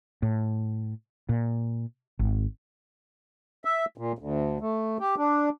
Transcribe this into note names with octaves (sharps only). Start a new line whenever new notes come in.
A2
A#2
G#1
E5
A#2
D2
A3
G4
D4